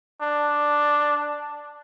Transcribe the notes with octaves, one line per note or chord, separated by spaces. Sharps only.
D4